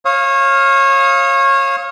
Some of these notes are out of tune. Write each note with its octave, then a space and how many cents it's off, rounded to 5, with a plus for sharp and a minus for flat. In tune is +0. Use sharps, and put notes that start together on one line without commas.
C#5 -25 F5 +0 D#6 +30